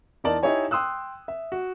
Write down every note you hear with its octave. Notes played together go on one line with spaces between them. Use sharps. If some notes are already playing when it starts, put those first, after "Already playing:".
E2 D#4 A#4 D5 A5 F#7
D#4 E4 G4 C#5 G#5
G5 C6 D#6 E6 F#6
E5
F#4